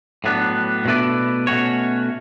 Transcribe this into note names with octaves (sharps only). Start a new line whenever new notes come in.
A2 F#3 B3 D4
B2 A3 E4 B4 D5
B2 A3 C#4 F#4 C#5